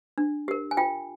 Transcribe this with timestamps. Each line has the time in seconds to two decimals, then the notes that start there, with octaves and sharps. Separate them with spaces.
0.18 D4
0.48 G4 A#4
0.71 G#5
0.77 F4 G5